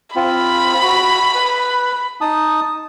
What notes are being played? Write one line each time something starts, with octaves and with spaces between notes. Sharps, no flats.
C4 F4 B5
F#4
B4
D#4 A5 D#6